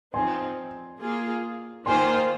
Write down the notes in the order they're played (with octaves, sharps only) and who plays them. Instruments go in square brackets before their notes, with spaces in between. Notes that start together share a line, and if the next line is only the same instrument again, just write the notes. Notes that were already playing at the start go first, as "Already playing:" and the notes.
[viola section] F3 C4 D#4 [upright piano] G#5 C6
[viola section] A#3 F4 G#4
[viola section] D#3 A#3 F4 C5 [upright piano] G#5 C6